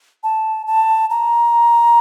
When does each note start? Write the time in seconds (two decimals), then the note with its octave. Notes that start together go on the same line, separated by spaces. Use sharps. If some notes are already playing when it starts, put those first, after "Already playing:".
0.23 A5
0.67 A5
1.10 A#5